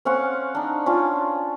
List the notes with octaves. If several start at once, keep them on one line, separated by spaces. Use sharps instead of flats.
C4 C#4 F5 F#5
D4 D#4
C#4 D4 F4